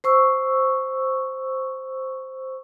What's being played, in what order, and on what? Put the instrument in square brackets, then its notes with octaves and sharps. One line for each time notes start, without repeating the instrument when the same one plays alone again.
[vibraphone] C5 C#6 E6